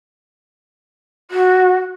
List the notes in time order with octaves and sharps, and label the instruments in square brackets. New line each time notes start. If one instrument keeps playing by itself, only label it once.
[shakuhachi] F#4